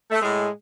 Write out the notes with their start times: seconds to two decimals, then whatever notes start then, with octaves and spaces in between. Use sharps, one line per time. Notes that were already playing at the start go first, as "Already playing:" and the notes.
0.10 A3
0.21 A2 G#3